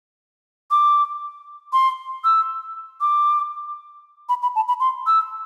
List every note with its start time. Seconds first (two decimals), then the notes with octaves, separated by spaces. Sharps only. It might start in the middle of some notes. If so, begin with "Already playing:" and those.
0.71 D6
1.73 C6
2.24 E6
3.01 D6
4.29 B5
4.42 B5
4.56 A5
4.68 B5
4.80 C6
5.07 E6